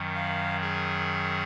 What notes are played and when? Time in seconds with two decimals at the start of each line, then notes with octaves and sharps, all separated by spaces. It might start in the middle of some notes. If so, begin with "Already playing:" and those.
Already playing: F#2 D#3 F#3
0.14 F5
0.61 G#4